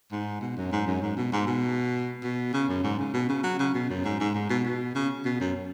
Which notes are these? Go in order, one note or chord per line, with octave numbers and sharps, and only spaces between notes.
G#2
B2
F#2
G#2
F#2
G#2
B2
G#2
B2
B2
C#3
F#2
G#2
C#3
B2
C#3
F#3
C#3
B2
F#2
G#2
G#2
G#2
B2
B2
C#3
B2
F#2